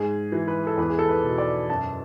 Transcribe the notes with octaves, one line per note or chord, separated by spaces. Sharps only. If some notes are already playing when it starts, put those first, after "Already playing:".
Already playing: G#2 G#4
E3
B4
A4
E2 B4
G#4
A4
B4
B2
D5
F#2 A5